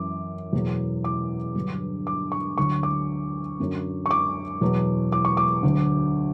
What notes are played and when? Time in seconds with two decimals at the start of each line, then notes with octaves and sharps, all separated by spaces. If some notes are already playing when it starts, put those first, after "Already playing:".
Already playing: F#2 E3 D6
0.53 E2 B2 F#3
1.04 D6
1.55 G2 D3 F#3
2.07 D6
2.32 C#6
2.58 D2 D3 F#3 C#6
2.83 D6
3.60 F#2 D3 F#3
4.06 C#6
4.11 D6
4.61 E2 B2 F#3
5.12 D6
5.25 C#6
5.37 D6
5.63 D2 D3 F#3